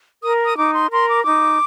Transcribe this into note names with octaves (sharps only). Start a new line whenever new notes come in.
A#4 D#6
D#6
D#4 D6
C6
A#4 C6
D6
D#4 D6